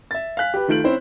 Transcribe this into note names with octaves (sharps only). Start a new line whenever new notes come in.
E5 A6
F5 G#5 F#6 B6
G4 B4
D#3 A3 F4 G6 D7 F#7
C4 C#4 E4 C5